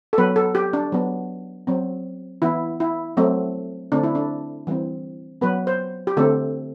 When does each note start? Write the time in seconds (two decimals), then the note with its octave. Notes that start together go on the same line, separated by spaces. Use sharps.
0.13 A4
0.18 F#3 B3 B4
0.36 A4
0.55 G4
0.73 D4
0.92 F#3 B3
1.67 F#3 C4
2.42 E3 B3 E4
2.80 E4
3.17 F#3 A3 C4
3.92 D3 A3 C4 D4
4.03 E4
4.15 D4
4.67 E3 G3 C4
5.41 F#3 B3 B4
5.67 C5
6.07 G4
6.17 D3 A3 C4 A4